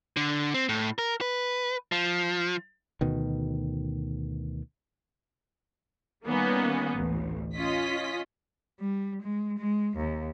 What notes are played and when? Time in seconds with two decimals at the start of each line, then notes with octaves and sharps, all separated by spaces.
0.17 D3
0.54 C4
0.69 A2
0.99 A#4
1.21 B4
1.92 F3
3.01 D2 B2 D#3
6.26 D#3 G3 A#3 B3 C#4
6.95 A1 D2
7.55 C#4 F4 D#5 B6
8.80 G3
9.22 G#3
9.58 G#3
9.97 D#2